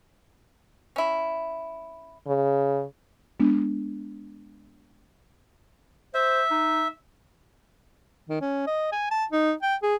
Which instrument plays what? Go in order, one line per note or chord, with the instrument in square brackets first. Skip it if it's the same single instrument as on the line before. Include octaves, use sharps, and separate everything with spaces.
[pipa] C#4 E4
[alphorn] C#3
[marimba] G#3 B3 D4
[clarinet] C5 [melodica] E5
[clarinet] D#4
[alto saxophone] D#3
C#4
D#5
G#5
A5
D#4
G5
G#4